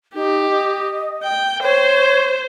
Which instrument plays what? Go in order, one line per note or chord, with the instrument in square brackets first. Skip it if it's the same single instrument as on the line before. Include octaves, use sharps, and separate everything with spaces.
[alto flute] D#4 [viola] G4
[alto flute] D#5
[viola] G5
[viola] C5 [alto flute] C#5